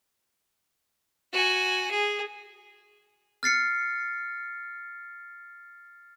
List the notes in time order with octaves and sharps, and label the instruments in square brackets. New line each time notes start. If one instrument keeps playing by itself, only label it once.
[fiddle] F#4 G#5
G#4
[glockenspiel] F6 A6 C7 C#7